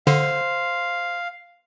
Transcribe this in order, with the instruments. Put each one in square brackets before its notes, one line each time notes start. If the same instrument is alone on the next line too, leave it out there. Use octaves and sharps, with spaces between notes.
[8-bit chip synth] D3 [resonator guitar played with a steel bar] C5 [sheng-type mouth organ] F5